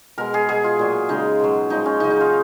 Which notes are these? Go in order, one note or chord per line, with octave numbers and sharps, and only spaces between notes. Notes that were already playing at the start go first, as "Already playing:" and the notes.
B2 G#3 A#4
G#4
B2 G#3 G#4
F4
A#2 F#3
C#3 G#3 D#4
B2 F#3
A#2 F3 G#3 D#4
C#4
C#3 F#3 D#4
D#4
F4